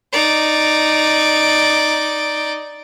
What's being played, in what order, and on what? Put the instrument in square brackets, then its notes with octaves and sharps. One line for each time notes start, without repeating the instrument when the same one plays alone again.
[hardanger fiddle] D#4 D5